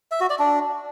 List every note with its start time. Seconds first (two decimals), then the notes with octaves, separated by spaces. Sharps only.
0.11 E5
0.21 F#4
0.30 D5
0.39 D4